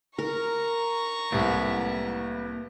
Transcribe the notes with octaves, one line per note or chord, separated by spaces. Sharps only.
A#4 A#5 C#6
C2 A2 A#3 B4